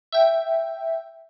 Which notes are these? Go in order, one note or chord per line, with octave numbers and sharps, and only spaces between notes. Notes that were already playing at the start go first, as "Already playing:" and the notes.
E5 G5